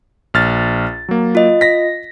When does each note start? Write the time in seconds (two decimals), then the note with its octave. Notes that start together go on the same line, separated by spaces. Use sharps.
0.34 A#1 F6 A6
1.09 F#3 A#3
1.35 F4 D#5
1.61 A#6 B6